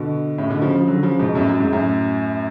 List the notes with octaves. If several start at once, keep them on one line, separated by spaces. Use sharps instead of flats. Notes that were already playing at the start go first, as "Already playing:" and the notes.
Already playing: B2 D3
A2 C#3
B2 D3
C#3 F3
C#3 F3
D3 F#3
C#3 F3
G#2 B2
F#2 A2
F#2
G#2
F#2 A2